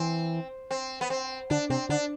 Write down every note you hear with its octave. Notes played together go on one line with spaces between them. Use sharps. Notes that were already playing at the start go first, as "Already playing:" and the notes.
Already playing: E3 C4
C4
B3
C4
D3 D4
C3 C4
D3 D4